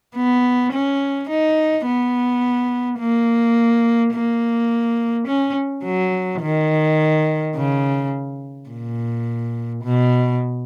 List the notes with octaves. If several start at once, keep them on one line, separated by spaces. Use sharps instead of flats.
B3
C#4
D#4
B3
A#3
A#3
C#4
F#3
D#3
C#3
A#2
B2